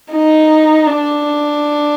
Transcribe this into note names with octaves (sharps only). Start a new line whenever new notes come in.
D#4
D4